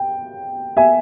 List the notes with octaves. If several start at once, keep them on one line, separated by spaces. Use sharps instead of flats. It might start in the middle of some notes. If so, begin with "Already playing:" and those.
Already playing: G5
E5 G#5